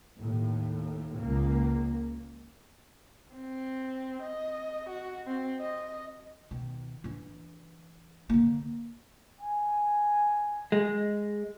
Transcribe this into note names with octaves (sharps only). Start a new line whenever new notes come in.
D#2 A2
C#2 A#3
C4
D#5
F#4
C4
D#5
B2 D#3
E3 D4
D3 A#3
G#5
G#3